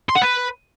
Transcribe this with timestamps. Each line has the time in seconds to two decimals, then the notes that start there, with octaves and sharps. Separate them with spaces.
0.09 C6
0.15 F#5
0.22 B4